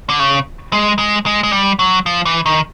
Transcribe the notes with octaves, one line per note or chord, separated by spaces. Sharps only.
D3
C#3
G#3
G#3
G#3
G#3
G3
F#3
F3
E3
D#3